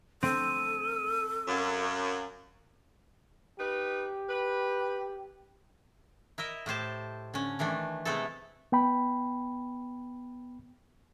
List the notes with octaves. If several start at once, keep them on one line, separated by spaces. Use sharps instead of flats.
C4 A4 D#7
F#2 F5
D#4 G4 B4
B4
E4 A#4 D#5 E5
A2 G4 C5 A5
D3 C#4
D#3 E3 A3 D4
C3 G#3 A3 B3 E4 A4
B3 G5 B5